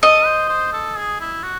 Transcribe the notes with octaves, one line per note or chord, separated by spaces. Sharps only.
A4 D#5
C5
C5
A4
G#4
E4
F#4